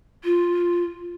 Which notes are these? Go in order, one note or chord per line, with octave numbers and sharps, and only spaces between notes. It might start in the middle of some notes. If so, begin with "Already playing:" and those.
F4